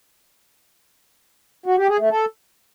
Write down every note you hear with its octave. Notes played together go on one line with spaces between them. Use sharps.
F#4
G4
G#4
A3
A4